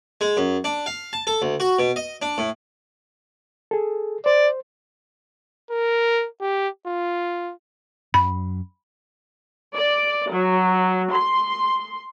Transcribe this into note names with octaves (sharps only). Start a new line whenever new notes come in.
G#3
F#2
D4
F5
A5
A4
D2
F#4
B2
D#5
D4
A2
G#4 A4
C5 D5
A#4
G4
F4
F#2 F#3 B5
D5
F#3
C6